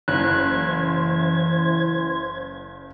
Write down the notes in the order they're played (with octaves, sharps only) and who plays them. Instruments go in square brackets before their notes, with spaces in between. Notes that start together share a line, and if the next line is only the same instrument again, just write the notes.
[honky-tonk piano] F#1 [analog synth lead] E3 [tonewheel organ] C5 G#6 [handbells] F#6